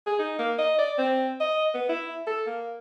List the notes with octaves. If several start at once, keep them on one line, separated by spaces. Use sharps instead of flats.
G#4
D#4
A#3
D#5
D5
C4
D#5
B3
E4
A4
A#3